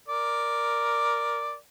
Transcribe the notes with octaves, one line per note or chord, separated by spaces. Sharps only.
A#4 D5